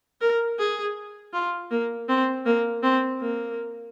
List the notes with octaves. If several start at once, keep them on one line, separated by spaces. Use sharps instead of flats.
A#4
G#4
F4
A#3
C4
A#3
C4
A#3